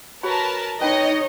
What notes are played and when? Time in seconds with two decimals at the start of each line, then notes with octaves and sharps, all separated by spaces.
0.23 F#4 A#4 B4 C#5 A5 B5
0.81 D#4 B4 C#5 D#5 G5 B5